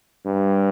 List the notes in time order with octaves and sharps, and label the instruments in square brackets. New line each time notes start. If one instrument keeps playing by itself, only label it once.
[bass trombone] G2